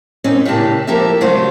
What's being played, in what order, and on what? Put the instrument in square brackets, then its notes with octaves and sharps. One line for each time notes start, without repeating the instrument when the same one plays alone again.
[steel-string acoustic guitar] A#2 C4 C#4 D#4
A2 C#3 A#3 D4 G4 A5
F3 A#3 G4 A4 E5
C#3 F#3 G3 A3 F4 C5